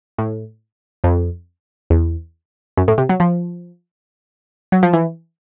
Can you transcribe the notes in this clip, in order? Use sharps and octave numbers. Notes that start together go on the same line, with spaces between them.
A2
F2
E2
F#2
A2
C3
F#3
F3
F#3
F3
E3